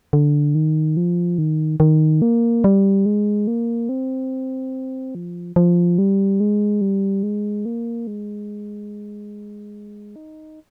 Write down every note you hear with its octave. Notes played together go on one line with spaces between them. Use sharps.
D3
D#3
F3
D#3
D#3
A#3
G3
G#3
A#3
C4
F3
F3
G3
G#3
G3
G#3
A#3
G#3
D#4